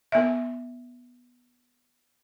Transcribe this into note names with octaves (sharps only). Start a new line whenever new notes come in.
B3 E5